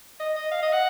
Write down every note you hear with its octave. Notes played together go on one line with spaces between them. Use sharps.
D#5
D#5
F5
D#5
F#5